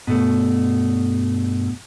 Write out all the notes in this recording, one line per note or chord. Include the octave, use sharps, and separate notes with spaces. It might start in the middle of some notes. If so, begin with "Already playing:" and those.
G2 B2 A3